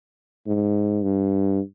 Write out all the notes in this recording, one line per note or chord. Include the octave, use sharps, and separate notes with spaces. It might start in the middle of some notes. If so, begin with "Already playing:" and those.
G#2
G2